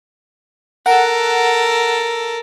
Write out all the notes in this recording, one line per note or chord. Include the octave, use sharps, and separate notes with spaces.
A4 A#4 F#5